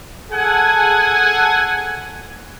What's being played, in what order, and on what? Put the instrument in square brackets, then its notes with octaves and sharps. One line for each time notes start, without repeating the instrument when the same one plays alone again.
[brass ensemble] G#4 A4 F#5 G#5